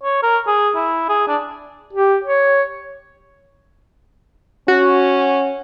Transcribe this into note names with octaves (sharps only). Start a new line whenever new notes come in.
C#5
A#4
G#4
E4
G#4
D4
G4
C#5
C#4 F#4